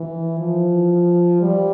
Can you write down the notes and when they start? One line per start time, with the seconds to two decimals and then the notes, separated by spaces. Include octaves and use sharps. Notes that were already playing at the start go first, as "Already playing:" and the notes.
Already playing: E3
0.39 F3
1.42 G3